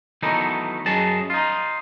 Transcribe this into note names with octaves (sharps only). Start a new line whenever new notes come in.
D#3 E3 F#3 A3 B3 D#4
F#2 F#3 G#4 D#5 A5
D#4 F4